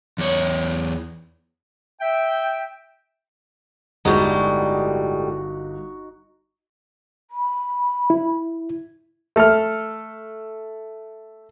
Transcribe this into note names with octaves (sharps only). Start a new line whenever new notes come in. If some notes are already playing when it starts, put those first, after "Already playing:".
E2 C#5
E5 G5
G1 A2 G3 G#3 D#4 F#4
B5
E4
A3 A4 E5 F6